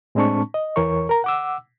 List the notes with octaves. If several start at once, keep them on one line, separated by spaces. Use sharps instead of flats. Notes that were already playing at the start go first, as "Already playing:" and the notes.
A2 G#3 C4 D4 A5 C#6
D#5
E2 E3 A#4 C#5 C#6
A#4 A#5
F#5 D6 E6